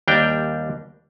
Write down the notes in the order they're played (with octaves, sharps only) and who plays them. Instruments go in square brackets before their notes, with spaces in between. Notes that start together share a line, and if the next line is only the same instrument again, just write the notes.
[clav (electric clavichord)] D#2 G3 D4 A#4 G5